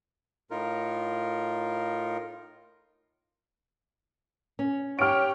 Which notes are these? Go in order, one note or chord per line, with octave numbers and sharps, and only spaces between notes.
A2 D#4 F4 A#4
C#4
G4 C#5 G5 F6 D7